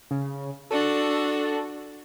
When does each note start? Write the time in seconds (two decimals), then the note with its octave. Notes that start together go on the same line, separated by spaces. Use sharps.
0.11 C#3
0.71 D4 F#4 A4